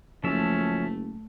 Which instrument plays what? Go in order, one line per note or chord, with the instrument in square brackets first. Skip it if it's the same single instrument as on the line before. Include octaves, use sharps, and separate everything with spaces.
[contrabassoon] F#1 [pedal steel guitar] F3 E5 [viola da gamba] A3 [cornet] C#4